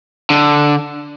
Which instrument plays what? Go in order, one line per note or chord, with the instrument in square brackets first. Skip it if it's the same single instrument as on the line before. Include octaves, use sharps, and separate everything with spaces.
[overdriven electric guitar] D3